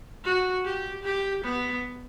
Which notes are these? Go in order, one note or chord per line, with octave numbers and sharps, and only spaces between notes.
F#4
G4
G4
B3